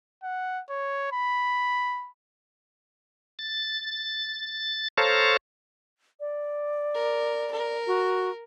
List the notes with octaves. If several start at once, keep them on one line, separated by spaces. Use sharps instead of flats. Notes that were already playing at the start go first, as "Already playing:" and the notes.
F#5
C#5
B5
A6
A4 C5 C#5 F5 A5 A#5
D5
A#4
A#4
F#4